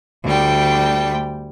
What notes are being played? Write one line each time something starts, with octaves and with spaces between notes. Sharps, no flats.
D2 G3 G5